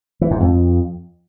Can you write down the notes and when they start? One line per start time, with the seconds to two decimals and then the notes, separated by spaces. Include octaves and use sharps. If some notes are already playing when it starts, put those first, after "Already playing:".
0.21 E3
0.31 G#2
0.40 F2